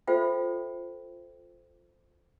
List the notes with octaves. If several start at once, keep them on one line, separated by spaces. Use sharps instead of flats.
F4 A4 C5 E5 F5 G5